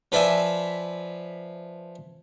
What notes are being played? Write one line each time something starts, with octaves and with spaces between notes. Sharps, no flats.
F3 B4 D5 E5 G#5